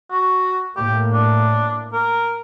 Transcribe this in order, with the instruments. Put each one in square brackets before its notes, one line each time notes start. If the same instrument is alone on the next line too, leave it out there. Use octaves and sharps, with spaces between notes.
[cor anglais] F#4
[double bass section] A2 A#3 [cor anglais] G4
[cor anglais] D4
A#4